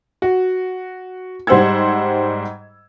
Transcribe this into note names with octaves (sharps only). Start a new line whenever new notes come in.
F#4
G#2 G3 C5 F#5 E6 G#6